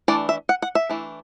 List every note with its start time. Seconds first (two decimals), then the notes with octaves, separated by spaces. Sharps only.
0.08 E3 A3 D4 D5
0.29 E5
0.49 F#5
0.62 F#5
0.75 E5
0.89 E3 A3 D4